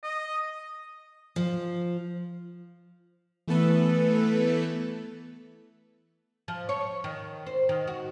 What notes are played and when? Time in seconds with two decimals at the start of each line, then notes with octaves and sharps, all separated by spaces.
0.04 D#5
1.36 F3
3.48 E3 A3 B3 A4 B4
6.48 F3
6.69 C#5
7.04 D#3
7.46 C5
7.69 D#3
7.87 F#4